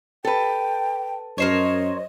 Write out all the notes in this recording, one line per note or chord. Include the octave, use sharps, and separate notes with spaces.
A4 B4 G5
F#2 A#4 C5 C#5 D#5